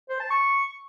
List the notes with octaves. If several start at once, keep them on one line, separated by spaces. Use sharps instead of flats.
C5
A5
C#6